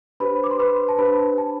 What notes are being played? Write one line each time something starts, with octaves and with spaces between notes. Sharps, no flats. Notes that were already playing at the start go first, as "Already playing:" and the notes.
D4 G4 B4 C5 B5
D6
C6
B4 B5
A5
D4 G4 B4 C5 B5
A5